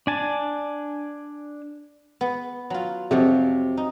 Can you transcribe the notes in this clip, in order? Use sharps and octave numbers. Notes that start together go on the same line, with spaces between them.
D4 G#5 A5
B3
F#3 F4
F2 C3 F3 F#3
D#4